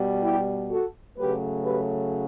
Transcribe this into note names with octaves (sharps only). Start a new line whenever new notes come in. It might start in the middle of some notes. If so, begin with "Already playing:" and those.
Already playing: B2 G3
E4 G4
F#4 A4
C#3 F#3 A3 G4 B4
G4 B4